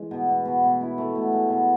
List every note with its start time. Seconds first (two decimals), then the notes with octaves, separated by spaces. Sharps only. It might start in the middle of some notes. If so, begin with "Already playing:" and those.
Already playing: E3 G#3
0.11 B2
0.28 B2
0.45 B2
0.63 B2
0.81 E4
0.98 A3
1.15 B2
1.33 G#3
1.50 B2